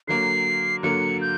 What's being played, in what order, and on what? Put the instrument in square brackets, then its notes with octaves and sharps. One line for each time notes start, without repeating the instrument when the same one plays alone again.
[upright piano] D3 F#3 A#3 [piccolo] C7
[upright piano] D3 F#3 A#3 [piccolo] C#7
[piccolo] G6